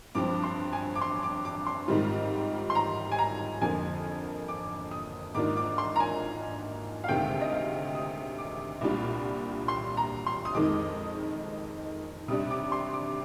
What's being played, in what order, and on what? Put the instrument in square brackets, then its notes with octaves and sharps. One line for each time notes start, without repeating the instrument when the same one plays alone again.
[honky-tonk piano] G2 F3 C4 [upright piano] D6
[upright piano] C6
G#5
D6
C6
D6
D6
C6
[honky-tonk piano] G#2 D#3 G3 C4 F4
[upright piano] C6
A#5
G#5
A#5
[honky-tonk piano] F2 D3 F3 A#3 [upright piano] G#5
[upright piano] D6
D#6
[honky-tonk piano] G#2 D#3 A#3 D4 F4 [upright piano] D6
[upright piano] D6
C6
A#5
G#5
F5
[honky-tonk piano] D2 C3 D#3 G#3 [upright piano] G5
[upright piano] D#5
F5
D#6
D6
[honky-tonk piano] C2 A#2 G3 D4 F4
[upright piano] C6
A#5
C6
D#6
[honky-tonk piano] F2 D#3 G#3 D#4 [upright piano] D6
[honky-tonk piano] C3 G3 D4 [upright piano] D#6
[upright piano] D6
C6
D6